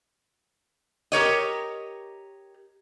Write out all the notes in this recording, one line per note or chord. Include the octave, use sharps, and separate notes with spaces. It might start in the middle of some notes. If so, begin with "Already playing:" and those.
G4 A#4 C#5 D#5